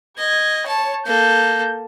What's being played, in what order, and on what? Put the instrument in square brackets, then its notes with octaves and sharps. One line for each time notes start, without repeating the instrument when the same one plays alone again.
[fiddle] D#5 [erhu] G#6
[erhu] C#5 [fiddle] A5
[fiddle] A#3 A4 [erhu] G6